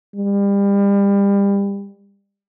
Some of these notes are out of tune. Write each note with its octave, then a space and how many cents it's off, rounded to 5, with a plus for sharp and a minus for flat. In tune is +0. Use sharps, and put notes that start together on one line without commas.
G3 +30